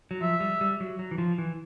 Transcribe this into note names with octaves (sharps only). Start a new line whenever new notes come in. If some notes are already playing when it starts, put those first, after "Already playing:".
F#3
F3 E5
G3
G3
F#3
F#3
E3
F3
E3